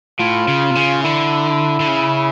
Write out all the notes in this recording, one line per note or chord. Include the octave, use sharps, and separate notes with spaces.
A2 F4
C#3
C3
C#3
D3 E4
D3
C#3